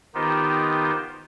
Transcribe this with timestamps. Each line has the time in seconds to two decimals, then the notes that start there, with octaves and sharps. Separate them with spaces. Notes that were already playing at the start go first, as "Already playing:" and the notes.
0.15 D#3 B3 D#4 F4 G4 C5